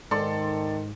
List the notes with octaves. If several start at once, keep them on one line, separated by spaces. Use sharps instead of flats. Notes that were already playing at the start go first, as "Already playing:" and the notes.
G#2 D#3 A4 D5 C6